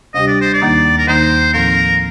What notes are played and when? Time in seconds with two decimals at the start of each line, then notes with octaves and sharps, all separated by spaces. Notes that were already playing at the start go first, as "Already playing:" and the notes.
0.14 D2 C3 G3 D4 G4 D#5
0.27 D5
0.41 C5
0.54 D5
0.61 D#2 D#3 A#3 D#4
0.98 A#4
1.08 D#2 D#3 A#3 D#4 C5
1.54 A2 F3 C4 A#4